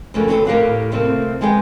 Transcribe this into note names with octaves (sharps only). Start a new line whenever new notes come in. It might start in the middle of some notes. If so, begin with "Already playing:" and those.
F2 C#3 A3 A#3 B4
D3 F#3 B3 C4 G#4 A4
A2 G4 A#4 D5 F5 F#5
C3 A3 A#3 C4
G3 G#3 B3 B4 G5